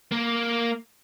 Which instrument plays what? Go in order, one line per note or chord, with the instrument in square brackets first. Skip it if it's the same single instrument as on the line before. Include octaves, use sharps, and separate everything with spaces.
[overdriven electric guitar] A#3